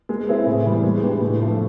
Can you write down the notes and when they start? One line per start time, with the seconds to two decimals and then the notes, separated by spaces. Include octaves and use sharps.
0.09 G#3
0.28 C4 E4 G#4 B4
0.46 A2
0.66 E3 G3
0.83 G#3
1.03 B3 D4 G4 B4
1.21 A2
1.40 F3 A3